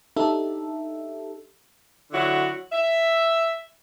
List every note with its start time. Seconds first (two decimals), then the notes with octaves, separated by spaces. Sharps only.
0.17 D4 D#4 G4 A4 E5
2.11 D3 F#3 E4 F#4
2.71 E5